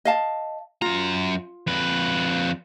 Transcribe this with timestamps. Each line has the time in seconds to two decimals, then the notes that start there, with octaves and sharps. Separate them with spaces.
0.05 D#5 F5 A5
0.82 F#2 F4 A#5
1.67 F2 B4